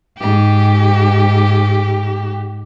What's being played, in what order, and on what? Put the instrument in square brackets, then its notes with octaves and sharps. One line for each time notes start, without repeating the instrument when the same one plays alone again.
[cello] G#2 G4